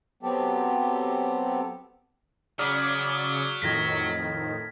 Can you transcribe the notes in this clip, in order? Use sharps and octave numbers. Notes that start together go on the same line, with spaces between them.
F#3 B3 C4 G4 A4
C#3 F#3 D5 D#6 F6 B6
F2 A2 D#3 G#6 A#6 B6